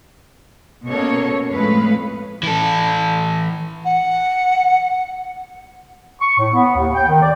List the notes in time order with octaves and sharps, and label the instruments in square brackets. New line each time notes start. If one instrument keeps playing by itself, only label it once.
[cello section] B2 A#3 C#4 A4 C#5
F2 A2 G#3 A3 B4 F5
[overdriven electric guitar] E3 A4
[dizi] F#5
[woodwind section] C#6
A2
B3
D#2
G5
D#3
D5